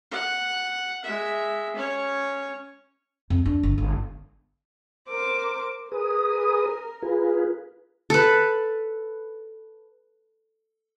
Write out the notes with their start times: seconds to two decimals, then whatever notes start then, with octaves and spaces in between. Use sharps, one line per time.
0.12 F#5
1.04 G#3 E5
1.76 C#4 C#5
3.30 F2
3.46 D4
3.63 G1
3.78 G1
5.08 A#4 C5 D6
5.92 G#4 A#4 B4 D#6
7.02 F4 G#4 B4
8.10 A4 B4